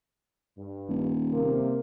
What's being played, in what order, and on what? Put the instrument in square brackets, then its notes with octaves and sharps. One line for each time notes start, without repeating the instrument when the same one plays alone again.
[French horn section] G2
[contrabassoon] D#1
[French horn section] C3 A#3